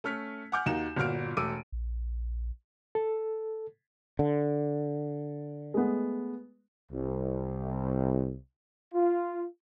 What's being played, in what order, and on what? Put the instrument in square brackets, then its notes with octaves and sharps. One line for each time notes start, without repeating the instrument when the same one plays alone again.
[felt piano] A3 C#4 F6 B6
F#5 G#5 D6 F6 G6
D#2 D#4 F#4 E7
G1 A#2 F#4 F6 D7
E1 A3 D6 E6 D7 D#7
[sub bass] A#1
[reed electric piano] A4
[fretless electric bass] D3
[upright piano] G#3 A3 B3
[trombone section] C2
F4